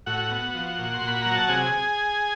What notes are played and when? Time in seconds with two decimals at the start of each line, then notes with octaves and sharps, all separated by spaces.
0.06 A2 F#4 F#5
0.31 B3
0.55 F3
0.78 A#2
0.94 C6
1.01 A#2
1.07 B5
1.22 F#3 A#5
1.35 A5
1.49 C3 G#4 G#5